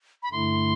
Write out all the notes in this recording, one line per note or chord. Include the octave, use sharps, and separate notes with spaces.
B5
G2 D3 A3 E4 C6